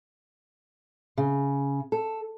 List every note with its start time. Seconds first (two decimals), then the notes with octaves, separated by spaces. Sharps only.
1.18 C#3
1.92 A4